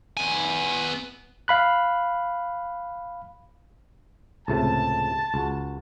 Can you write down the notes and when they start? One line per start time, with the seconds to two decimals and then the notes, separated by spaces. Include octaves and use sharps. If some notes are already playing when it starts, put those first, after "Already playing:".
0.17 B3 G#5
1.48 F5 B5 F#6
4.48 C#2 A2 C3 A5
5.34 C#2 F#4